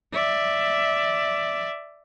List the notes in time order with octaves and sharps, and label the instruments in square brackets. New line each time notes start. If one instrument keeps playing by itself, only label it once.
[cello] D5 E5